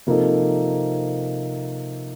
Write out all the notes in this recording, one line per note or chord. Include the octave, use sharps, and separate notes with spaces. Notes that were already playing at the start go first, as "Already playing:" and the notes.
C3 F3 A#3 D#4 A4